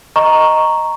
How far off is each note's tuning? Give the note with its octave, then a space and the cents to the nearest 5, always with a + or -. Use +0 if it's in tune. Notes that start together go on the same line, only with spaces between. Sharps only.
D#5 +0 A#5 +0 C#6 +0